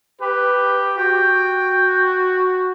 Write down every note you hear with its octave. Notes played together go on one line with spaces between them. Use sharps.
G4 B4
F#4 G5